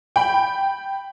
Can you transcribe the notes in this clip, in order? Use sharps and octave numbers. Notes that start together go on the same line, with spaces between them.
G5 B5